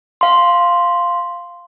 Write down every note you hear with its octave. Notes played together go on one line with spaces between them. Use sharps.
F5 C6